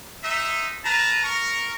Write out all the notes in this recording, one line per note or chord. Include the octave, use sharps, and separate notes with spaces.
G#3 D#4 E5
A#4 B4 A5 A#5
A#4 C#6